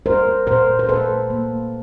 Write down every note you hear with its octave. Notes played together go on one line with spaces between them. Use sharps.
G3 A#4 C5
A#2 A#4 C5
C5
A#2 A4 B4
A#3